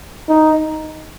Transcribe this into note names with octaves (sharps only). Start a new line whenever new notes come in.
D#4